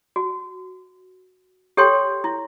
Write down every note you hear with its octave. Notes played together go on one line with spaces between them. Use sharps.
F#4
G4 A4 C#5 G5 C6
E4